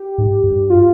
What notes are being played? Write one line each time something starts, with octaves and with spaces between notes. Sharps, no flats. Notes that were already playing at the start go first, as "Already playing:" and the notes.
Already playing: G4
G#2
G2
F4